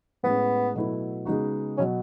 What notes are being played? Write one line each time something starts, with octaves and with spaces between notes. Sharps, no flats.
A2 G#3 B3 C#4
B2 F#3 A3 E4 B4
C#3 G#3 B3 D#4 F#4
B2 F#3 C#4